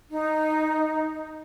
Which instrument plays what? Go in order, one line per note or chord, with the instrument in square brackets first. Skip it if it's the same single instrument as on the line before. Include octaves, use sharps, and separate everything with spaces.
[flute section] D#4